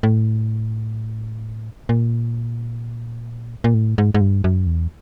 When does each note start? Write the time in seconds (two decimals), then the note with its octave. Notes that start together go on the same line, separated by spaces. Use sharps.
0.03 A2
1.89 A#2
3.64 A#2
3.74 A2
3.98 G#2
4.14 G#2
4.21 G2
4.44 F#2
4.67 E2